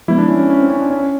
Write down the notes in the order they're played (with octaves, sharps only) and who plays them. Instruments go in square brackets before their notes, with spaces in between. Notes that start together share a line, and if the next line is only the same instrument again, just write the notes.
[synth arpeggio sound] F3 G#3 B3 [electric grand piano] E4
[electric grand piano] D4
C#4
C#4
C#4
C4
C#4
D4
C#4